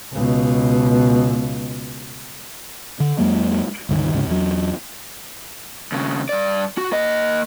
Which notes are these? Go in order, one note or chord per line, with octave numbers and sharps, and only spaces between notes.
C#2 B2
D3
F2 F#3 G#3 A#3
C#2 G2 D3 D#3
D2 G#2 C#3
E2 F#3
D#2 C#3
G2 D5
F#4
A#3 D#5